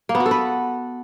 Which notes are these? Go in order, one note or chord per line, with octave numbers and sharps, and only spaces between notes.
A#3
B3
F#4
A4
B4